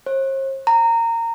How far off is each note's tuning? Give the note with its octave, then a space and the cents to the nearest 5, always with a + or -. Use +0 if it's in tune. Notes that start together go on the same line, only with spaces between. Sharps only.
C5 +45
A#5 -20